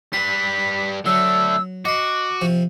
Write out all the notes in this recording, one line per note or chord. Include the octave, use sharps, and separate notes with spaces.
G3 B4 C6 B6
D3 F#3 A3 E6
F#4 D#5 C6 D6
C3 F3